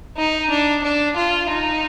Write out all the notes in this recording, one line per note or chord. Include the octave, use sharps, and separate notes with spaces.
D#4
D4
D4
F4
D#4